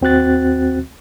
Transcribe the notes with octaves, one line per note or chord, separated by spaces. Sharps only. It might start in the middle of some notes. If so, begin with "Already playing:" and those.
D#2 C4 F#4 F#6 A6